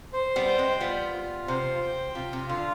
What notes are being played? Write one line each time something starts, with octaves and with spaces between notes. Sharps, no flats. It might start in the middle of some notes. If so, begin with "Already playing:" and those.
C5
G3 B3
G5
G#3 C4
G3 B3 F4
F4
C3 C5
G5
C3 F4
C3
D3 F4